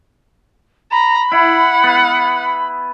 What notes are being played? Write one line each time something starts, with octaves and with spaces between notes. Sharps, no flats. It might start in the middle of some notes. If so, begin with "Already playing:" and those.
A#5 B5
E4 F#5
B3